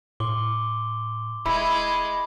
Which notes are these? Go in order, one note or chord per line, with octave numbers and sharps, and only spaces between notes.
A2 C6 D6 G7
D#1 G#3 E4 B5